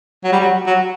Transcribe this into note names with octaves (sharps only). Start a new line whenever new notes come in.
F#3
G3
F#3
F#3